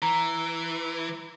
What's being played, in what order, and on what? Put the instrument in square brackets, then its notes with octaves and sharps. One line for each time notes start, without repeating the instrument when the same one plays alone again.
[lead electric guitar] E3 [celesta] A#5